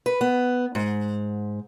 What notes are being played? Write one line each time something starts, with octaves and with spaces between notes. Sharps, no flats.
B4
B3
G#2